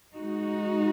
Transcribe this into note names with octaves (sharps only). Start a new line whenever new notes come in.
G#3 D#4 F#4